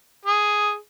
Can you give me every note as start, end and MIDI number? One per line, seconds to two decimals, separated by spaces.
0.26 0.76 68